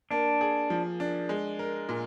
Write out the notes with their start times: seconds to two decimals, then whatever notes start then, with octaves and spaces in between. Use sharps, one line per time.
0.11 A#3 D4
0.41 G#4
0.70 F3
1.00 D4
1.29 G#3
1.59 A#4
1.89 A#2